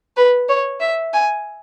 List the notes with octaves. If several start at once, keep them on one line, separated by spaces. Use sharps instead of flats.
B4
C#5
E5
G#5